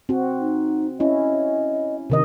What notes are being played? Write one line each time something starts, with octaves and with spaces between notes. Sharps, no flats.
C4 F#4
D#4
C#4 E4 D#5
C3 D#3 D#5